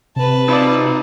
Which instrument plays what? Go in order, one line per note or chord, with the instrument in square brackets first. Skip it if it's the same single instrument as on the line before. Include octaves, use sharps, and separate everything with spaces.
[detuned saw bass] C3 [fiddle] B4 A5
[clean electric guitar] C4 F4 D5 [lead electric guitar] D#4 B5